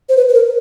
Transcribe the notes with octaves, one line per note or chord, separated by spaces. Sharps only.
C5
B4
B4
A#4